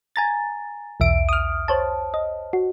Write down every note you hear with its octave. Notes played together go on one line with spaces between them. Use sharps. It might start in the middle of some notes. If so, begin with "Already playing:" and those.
G#5 A#5 A6
B1 E2 E5 D7
D#6 F6
C5 C#5 A5
D#5
F#4